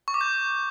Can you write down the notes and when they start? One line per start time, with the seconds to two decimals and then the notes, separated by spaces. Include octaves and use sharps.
0.08 C#6
0.14 D6
0.21 G6